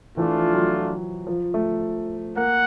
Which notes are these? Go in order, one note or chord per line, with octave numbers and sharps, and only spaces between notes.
E3 A3 D4 F4
F3
F#3
F3
A3
A#3 F#5